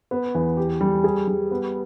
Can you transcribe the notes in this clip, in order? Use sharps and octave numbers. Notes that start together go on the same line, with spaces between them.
B3
E2
G4
G3
G#4
G3
B3